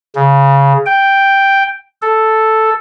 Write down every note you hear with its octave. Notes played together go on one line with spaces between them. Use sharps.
C#3
G5
A4